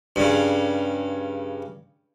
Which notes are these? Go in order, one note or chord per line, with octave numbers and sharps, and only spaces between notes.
G2 C#3